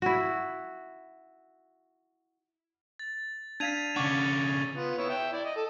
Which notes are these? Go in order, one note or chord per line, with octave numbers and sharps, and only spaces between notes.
E4 F#4
A6
D4 F5 G#6 B6 D#7 F7
C#3 D4 F#5 C#6 D6 A6
B3 F4
B3 E4 C#5
E5 G5
E4 D5
D#5
A4